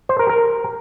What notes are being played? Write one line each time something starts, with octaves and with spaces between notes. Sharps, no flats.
C5
A#4
A#4